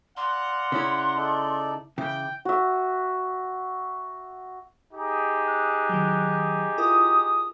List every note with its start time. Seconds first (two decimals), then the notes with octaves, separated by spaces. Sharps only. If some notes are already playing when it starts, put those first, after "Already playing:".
0.17 D5 F5 F#5 A#5 C6
0.72 C#3 C#4 E4
1.17 D#4 A4 D5
1.98 C#3 E3 G5 D6
2.45 F#4 E5
4.92 D#4 G4 G#4
5.47 F#6
5.89 D#3 F#3
6.78 E4 F4 A#4 D#6